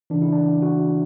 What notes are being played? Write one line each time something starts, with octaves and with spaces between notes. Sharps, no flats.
C#3 E3 D4
E4
D4
F#4